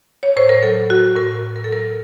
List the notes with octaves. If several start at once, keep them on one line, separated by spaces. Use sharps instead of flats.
C#5
A2 C5
A#4
F#3 A4
F#3 F#4
A2 A#4
A2
A#4
A4
F#3 A#4